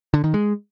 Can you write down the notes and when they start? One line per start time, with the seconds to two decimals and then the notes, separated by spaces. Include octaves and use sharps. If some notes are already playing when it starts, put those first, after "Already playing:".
0.14 D3
0.24 D#3
0.34 G#3